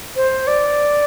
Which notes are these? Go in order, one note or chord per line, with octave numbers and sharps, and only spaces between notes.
C5
D5